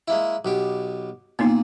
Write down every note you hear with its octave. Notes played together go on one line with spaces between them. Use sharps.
G#3 A#3 E4
B1 B2 G4
A#2 A#3 B3 D#4